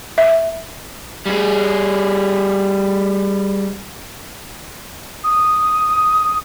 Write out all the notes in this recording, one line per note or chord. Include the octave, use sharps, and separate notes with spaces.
E5
G3 G#4
D#6